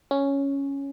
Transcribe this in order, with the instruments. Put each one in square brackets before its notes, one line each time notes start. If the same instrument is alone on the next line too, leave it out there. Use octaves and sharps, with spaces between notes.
[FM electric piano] C#4